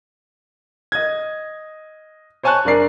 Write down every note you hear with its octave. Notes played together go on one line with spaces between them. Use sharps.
D#5 G#6
C5 C#5 G#5 A5 C#6 F#6
F#1 D4 A#4 D5 C7